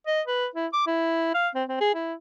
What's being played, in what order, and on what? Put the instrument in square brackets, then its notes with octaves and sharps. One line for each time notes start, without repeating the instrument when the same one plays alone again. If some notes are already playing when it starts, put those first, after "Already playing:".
[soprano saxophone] D#5
B4
E4
D6
E4
F5
C4
C4
G#4
E4